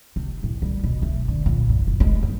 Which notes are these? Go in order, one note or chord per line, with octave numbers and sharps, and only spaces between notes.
C3
A2
G3
B2
A3
D3
A#1
G2
F#1
G#3
G2